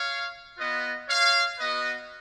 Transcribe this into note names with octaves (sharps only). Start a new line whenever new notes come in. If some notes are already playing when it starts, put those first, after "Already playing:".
Already playing: C#5 F5
B3 F4 B4 D#5
C#5 F5
B3 F#4 B4 D#5